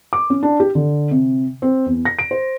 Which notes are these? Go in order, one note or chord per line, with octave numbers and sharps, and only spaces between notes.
D6
C#4
D4
G4
D3
C3
C4
E2
A#6
D7
C5